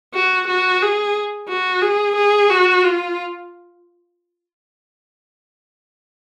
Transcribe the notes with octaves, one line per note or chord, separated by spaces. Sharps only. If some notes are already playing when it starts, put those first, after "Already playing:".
F#4
F#4
G#4
F#4
G#4
G#4
F#4
F4